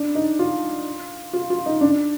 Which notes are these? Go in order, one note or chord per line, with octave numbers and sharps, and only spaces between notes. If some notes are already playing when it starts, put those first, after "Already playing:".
Already playing: D4
D#4
F4
F4
F4
D#4
D4